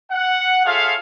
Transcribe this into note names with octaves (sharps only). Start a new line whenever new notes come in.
F#5
F4 G#4 A4 C#5 E5 F5